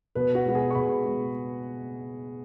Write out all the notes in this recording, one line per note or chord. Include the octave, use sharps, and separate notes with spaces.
B2 B4
F#4
G#3 B3 F#4
G#4
C#6
B2 B5
G#3 B3